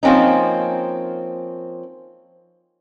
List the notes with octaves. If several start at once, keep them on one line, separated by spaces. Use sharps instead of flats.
F3 A#3 C4 C#4 D#4